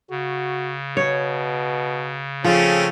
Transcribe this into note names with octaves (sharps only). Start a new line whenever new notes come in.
C#3 F#4
B2 C#5
F3 A3 C4 C#4 G#4